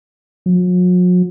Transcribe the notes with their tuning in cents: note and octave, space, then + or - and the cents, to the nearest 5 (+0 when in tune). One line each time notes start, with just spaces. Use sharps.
F#3 -45